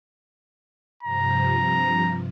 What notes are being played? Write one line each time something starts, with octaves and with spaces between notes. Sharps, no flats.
G2 C3 F3 A#5